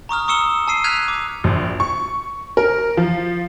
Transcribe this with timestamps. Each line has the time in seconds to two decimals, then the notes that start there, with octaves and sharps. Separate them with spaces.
0.09 A#5 C#6 D#6 F6
0.28 C#6 D#6 E6 C#7 E7 G7
0.68 A5 E6 C7 D#7
0.84 F6 F#6 G#6 B6 D#7 F7
1.08 D6
1.44 A#1
1.80 C#6
2.57 A#4
2.97 F3